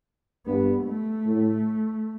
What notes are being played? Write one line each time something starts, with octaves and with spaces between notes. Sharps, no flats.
G2 B3
A3
A2